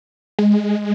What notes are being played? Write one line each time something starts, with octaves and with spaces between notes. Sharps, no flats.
G#3